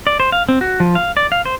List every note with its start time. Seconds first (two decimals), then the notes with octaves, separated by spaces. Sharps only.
0.07 D5
0.20 C5
0.32 F5
0.49 C4
0.61 F#4
0.80 F3
0.95 F5
1.17 D5
1.32 F5
1.46 C5